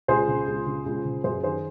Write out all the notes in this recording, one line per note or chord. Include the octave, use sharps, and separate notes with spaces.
C#2 G#4 C5
C#3
C#2
C#3
C#2
C#3
F#2 G#4 C5
D#3 G#4 C5